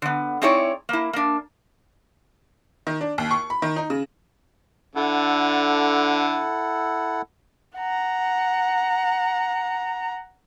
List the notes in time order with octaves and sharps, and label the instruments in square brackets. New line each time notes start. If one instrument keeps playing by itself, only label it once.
[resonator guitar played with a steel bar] D3 B3
C4 D#4 E4 G#4 C#5 D5
A#3 E4
A#3 D4
[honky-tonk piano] D#3
D4
D#2
C#6
B5
D#3
D#4
C#3
[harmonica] D3 [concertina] E4 A4 F#5
[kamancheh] F#5 A#5